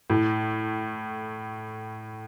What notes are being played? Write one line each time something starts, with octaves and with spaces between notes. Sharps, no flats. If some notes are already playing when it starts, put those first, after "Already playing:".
A2